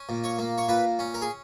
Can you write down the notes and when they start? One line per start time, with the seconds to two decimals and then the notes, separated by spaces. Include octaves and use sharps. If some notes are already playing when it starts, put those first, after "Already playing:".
Already playing: C#4
0.09 A#2
0.24 C#5
0.39 A#3
0.58 C#5
0.68 A#2 B4
0.99 C#4
1.14 A#4
1.22 G#4